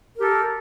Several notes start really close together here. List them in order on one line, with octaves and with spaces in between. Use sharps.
A#4 G4 A4